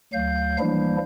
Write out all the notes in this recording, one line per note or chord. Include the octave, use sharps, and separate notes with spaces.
D2 F#3 F5 G6
E3 F3 G3 A#3 D4 E4